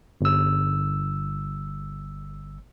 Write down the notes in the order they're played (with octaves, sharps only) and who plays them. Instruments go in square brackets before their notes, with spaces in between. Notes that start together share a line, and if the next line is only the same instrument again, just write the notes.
[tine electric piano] G1 E6